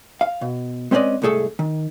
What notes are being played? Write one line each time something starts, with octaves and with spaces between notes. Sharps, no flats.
F5
B2
G#3 C4 C#4 B4 D5 D#5
C2 G#2 A3 G#4 A4
D#3